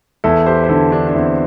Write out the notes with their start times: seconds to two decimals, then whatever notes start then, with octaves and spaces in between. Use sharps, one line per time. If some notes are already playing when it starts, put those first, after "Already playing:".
0.24 E2 E4 A4
0.46 G4 C5
0.64 C5
0.69 D3 E4 A4
0.92 D4 G4
1.08 D4
1.14 E2 C4 E4